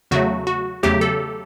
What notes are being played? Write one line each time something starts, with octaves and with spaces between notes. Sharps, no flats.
E2 C#3 F#3 A3 F#4
F#4
E2 C#3 F#3 A3 G4
A4